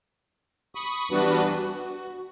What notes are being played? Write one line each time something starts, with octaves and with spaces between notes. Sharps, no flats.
B5 C#6 D#6
E3 G3 B3 D4 F#4 B4
F#4